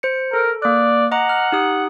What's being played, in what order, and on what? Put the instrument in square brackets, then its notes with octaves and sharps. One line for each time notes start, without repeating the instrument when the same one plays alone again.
[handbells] C5 C#7
[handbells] A4 [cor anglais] A#4
[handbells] A#3 F#6 [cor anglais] D5
[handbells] D#5 A#5 D6 [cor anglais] F#5
[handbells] F6
D#4 G4 D#6